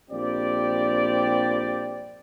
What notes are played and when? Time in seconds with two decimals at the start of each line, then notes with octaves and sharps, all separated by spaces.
0.10 A#1 G3 C4 G4 D5